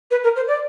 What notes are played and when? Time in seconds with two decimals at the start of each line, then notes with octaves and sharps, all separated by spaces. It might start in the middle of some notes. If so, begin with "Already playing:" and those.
0.10 B4
0.23 A#4
0.35 C5
0.47 D5